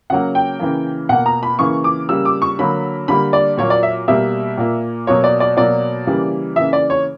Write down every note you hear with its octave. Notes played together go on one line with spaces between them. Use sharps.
C#3 F#3 A#3 F#5
G5
C#3 E3 A#3
B2 A#3 F#5
A#5
B5
C#3 E3 A#3 C#6
D6
C#3 G3 A#3 E6
D6
C#6
D3 F#3 A#3 B5
D3 G3 A#3 B5
D5
A#2 F#3 A#3 C#5
D5
E5
B2 G3 A#3 E5
A#2 A#3
B2 F#3 A#3 C#5
D5
D5
B2 F#3 A#3 D5
C#3 E3 G3 A#3
C#3 E3 A#3 E5
D5
C#5